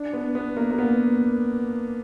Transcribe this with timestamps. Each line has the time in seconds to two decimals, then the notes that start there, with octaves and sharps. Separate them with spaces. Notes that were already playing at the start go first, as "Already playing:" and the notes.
Already playing: D4
0.13 B3
0.35 B3
0.57 A#3
0.71 A#3
0.78 B3